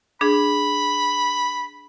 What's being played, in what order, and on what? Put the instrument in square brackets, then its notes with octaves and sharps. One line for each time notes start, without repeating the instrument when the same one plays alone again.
[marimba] D4 G#4 [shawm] B5